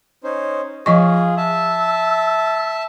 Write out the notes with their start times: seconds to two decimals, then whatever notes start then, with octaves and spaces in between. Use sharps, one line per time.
0.24 C#4 D#4 C5
0.86 F3 F4 G#4 D#5 C#6
1.37 E5 A5 E6